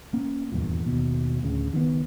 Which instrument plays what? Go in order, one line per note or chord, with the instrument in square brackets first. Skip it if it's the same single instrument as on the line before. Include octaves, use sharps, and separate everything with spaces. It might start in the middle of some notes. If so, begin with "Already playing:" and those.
[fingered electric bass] A#3 C#4
D#1 E2 G2 A#2
D#2 B2
D1 D2 C#3
C#2 D#3 E3 B3